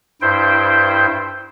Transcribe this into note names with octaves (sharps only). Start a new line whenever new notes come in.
G2 E4 C5 G5